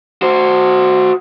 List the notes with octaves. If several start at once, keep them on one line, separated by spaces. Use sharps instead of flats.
F#4 C5